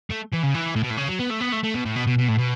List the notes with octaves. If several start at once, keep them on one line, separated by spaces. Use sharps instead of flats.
A3
E3
C#3
E3
A2
B2
A2
C#3
F#3
B3
A3
B3
A3
A3
B2
A2
B2
B2
B2
A2
B2